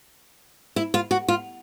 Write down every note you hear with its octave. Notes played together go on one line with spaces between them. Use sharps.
E4
F4
F#4
F4